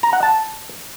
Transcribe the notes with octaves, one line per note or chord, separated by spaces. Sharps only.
A#5
F#5
A5